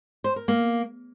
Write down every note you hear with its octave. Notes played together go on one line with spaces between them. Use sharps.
C5
A#4
A#3